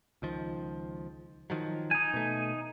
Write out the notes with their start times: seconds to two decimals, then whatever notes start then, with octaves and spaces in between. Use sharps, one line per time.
0.22 C#2 D#3 F3
1.50 D#3 F3 F#3
1.91 D#4 G#5
2.14 B2 A3